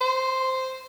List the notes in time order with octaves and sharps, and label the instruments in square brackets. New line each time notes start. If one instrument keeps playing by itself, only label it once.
[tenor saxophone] C5